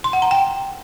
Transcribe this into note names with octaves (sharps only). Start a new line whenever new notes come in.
C6
F#5
A#5
G5